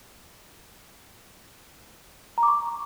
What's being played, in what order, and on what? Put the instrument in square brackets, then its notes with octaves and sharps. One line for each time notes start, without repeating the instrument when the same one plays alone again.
[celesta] A#5
D6
C#6